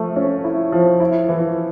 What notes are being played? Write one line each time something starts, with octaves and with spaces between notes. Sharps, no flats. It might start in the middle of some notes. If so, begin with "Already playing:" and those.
Already playing: F3 A3
C#4
E4
F3
E4
E3